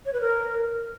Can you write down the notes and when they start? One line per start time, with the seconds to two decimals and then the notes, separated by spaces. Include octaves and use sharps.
0.06 C#5
0.13 B4
0.21 A#4